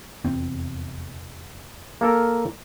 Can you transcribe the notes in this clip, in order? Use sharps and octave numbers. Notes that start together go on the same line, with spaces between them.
F1 E2 C4
A#3 A4 A#4